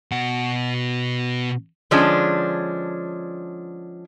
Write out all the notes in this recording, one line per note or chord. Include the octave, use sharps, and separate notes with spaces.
B2 F#5
D3 F3 G#3 C#4 D4